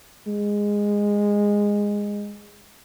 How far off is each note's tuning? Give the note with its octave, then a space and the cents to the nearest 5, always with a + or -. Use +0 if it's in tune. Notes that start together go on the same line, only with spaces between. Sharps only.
G#3 -15